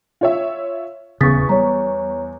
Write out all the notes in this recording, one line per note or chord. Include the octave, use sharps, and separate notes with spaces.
F4 C#5 E5
D#1 E2 C#3 C#6 D#6 A6 B6
G3 C#5 A#5